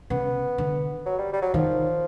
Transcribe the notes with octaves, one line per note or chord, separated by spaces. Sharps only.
C#3 B3
D3
F#3
G3
G3
F#3
D#3 F3